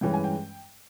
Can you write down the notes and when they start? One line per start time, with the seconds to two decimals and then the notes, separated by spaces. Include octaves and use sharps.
0.01 G2 E3 G#3 C#4 G5
0.14 G#5
0.24 G5